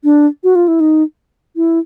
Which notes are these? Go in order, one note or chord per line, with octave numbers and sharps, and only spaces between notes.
D4
F#4
F4
E4
D#4
E4